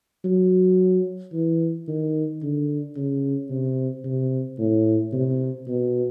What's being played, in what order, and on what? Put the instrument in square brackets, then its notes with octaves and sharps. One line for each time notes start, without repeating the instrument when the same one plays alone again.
[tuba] F#3
E3
D#3
D3
C#3
C3
C3
A2
C3
B2